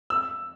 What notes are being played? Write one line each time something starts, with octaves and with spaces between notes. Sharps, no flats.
E6